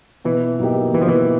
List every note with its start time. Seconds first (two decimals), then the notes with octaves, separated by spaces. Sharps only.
0.25 B2 E3
0.59 F#3 A#3 D#4 G4
0.94 B2 E3
1.02 F3
1.08 E3